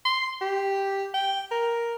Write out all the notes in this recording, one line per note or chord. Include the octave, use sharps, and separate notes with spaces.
C6
G4
G5
A#4